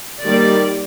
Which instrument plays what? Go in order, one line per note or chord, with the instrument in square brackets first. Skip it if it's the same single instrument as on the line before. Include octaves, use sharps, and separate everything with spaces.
[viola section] D#3 G3 A#3 D5